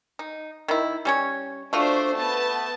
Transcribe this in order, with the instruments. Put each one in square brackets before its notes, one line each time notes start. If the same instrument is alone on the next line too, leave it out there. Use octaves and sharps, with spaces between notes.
[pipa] D#4
D#3 E4
G3 C#4 C#5
[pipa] A3 F4 F#4 [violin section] D4 C5
[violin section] B3 A5